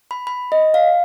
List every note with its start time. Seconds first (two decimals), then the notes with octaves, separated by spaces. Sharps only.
0.11 B5
0.27 B5
0.52 D#5
0.74 F5